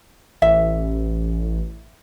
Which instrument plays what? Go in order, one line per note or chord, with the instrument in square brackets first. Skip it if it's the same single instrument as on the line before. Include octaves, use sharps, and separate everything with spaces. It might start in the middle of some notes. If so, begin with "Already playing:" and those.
[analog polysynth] A1 [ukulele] E5